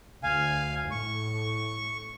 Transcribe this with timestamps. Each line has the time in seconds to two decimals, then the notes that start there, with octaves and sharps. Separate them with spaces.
0.23 D2 F5 G#5
0.91 A2 A3 C#6